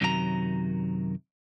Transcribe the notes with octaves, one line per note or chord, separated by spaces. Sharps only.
F#2 C3 D#3 F#3 G4 A#5